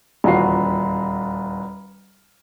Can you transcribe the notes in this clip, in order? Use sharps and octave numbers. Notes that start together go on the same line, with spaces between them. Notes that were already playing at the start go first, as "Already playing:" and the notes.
D#1 E2 F4 F#4 C7